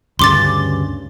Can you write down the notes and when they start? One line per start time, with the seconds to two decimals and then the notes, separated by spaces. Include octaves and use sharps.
0.19 D2 G2 C#3 C6 D6 A6